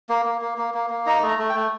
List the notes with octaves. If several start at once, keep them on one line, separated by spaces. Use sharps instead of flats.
A#3
A#3
A#3
A#3
A#3
A#3
D#4 A#5
A3
A#5
A3
G5
A3